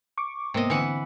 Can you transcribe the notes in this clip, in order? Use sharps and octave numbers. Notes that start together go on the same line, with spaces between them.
C#6 D6
G#2 C3 A#3 B3 D#5
D3 E3 C4 B4 F#5